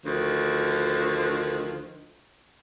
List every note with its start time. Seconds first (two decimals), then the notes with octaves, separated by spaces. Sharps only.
0.04 D2 D#3 F3